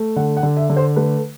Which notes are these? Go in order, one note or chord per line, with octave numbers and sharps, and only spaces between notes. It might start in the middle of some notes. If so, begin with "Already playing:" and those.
Already playing: A3
D3 F#5
F#5
D3
E5
D3
C5
A3 B4